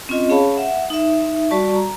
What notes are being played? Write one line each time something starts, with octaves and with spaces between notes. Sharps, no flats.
C4 C#4 F4 D#5
C#4 G#4 C#5 F5 A5 B5
E5 F#5
D#4 E5
G3 F#4 D5 A5 C#6
A#5